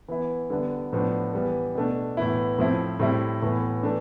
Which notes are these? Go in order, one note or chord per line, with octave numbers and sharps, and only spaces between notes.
E3 B3 E4
D3 G3 B3 D4
A2 F3 B3 D4
E3 G3 B3
B2 A3 D4
A2 E3 B3 E4
A2 F3 C4 E4
A2 G3 C4 E4
A2 E3 B3
E3 A3 D4